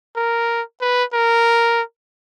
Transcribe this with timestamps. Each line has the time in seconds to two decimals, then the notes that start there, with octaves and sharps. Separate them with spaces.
0.16 A#4
0.81 B4
1.13 A#4